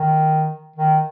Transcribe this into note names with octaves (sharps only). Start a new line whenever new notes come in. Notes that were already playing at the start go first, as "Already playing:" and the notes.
Already playing: D#3
D#3